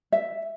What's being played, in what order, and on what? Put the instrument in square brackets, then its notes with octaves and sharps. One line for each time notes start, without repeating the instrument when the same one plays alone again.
[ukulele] E5